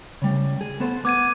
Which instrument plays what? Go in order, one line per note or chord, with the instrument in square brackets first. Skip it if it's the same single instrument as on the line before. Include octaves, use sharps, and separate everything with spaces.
[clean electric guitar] C#3 G3
G#4
B3 A4 C5
[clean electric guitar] B3 [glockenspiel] D6 G#6 D#7